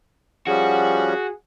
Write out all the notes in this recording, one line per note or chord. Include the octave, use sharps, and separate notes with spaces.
F3 G3 C#4 F#4 G#4